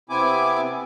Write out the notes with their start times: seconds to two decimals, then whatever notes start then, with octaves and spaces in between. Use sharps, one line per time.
0.10 C3 B3 C4 E4 G#5 D6